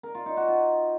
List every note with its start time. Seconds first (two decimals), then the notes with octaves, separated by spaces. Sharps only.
0.03 A#4
0.15 F4
0.26 D#4
0.37 F#4
0.48 F4